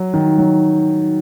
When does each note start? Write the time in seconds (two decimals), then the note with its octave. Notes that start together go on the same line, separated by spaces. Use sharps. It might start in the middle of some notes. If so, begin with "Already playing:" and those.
Already playing: F#3
0.14 D#3
0.38 F#3